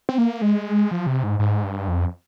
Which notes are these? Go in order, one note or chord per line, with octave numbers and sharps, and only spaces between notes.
C4
A#3
G#3
F3
C3
G#2
G#2
G2
F2